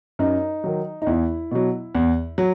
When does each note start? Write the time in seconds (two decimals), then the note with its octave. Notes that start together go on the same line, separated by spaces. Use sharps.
0.19 F#2 D#4
0.64 D#3 F#3
1.02 D#4
1.07 E2 E4
1.51 B2 F#3
1.95 E2
2.38 F#3